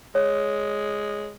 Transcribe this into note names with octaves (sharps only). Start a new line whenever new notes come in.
G#3 C#5